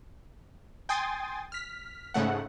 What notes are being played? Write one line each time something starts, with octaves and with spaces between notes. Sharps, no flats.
G5 G#5 C6 D#6 A6
F6 B6
G#2 C#3 A3 F#5